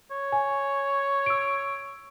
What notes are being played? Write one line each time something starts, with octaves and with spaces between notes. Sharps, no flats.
C#5
G#5
E6 D7